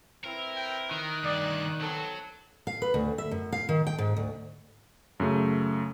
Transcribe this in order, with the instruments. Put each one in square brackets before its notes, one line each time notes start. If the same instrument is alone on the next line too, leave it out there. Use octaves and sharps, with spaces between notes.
[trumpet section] C4 E4 B4 [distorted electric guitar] A#4
[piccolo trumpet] G5
[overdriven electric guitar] D#3 [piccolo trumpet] F#6
[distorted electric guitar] D2 G2 [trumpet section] D5
[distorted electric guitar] F#3 [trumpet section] B3 C4 A4
[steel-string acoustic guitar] F5
B4
D2
E5
F#2
F5
D#3
G5
G#2
D2
[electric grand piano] F#2 C#3 A3